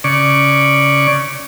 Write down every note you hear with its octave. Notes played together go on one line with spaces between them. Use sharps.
C#3 D5 C#6